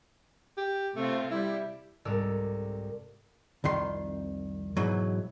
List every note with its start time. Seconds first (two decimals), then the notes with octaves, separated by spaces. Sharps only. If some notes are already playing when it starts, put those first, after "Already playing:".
0.57 G4
0.96 C3 A3 C4 F4
1.31 G3 E4
2.05 C2 G#2 A4 A#4 D5 E6
3.64 C2 F2 D#3 C6
4.77 G#2 B2 E3 F#3